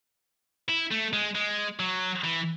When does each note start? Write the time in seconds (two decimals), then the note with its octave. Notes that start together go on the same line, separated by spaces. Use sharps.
0.69 E4
0.91 A3
1.13 G#3
1.35 G#3
1.79 F#3
2.24 E3